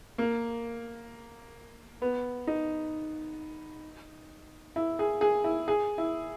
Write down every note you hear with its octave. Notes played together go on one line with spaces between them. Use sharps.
A#3
B3
D#4
E4
G#4
G#4
E4
G#4
E4